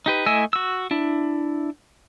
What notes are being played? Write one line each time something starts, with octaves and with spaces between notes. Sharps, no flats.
D#4 G4 B4
A3 E4 D#5 G#5 E6
F#4 E6
D4 E4